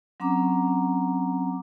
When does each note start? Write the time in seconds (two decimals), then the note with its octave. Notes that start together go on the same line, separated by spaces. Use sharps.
0.20 F#3 C4 C#4 F#5 A#5 D6